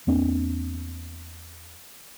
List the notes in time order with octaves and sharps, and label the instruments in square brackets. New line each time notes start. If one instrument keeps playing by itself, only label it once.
[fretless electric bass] E2 A#3 C4 D4